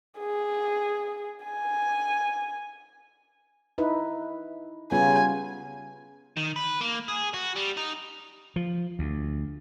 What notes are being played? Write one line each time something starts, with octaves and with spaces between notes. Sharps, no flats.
G#4
G#5
D#4 E4 B4
C#3 G3 B3 F4 G#5
D#3
B4
A#3
G#4
F#4
G3
D#4
F3
D2